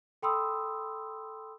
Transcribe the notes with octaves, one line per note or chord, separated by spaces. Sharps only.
A4 G5 B5 C6 D#6 E6